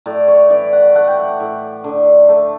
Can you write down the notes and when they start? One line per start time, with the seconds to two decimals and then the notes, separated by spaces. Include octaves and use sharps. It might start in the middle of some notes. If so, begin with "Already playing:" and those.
0.06 A2 D5
0.28 C#5
0.50 E3 D5
0.73 F#5
0.95 A3 F#5
1.07 G5
1.20 F#5
1.40 A2
1.84 D3
2.29 A3